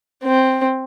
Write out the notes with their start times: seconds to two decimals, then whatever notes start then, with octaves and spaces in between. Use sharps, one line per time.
0.24 C4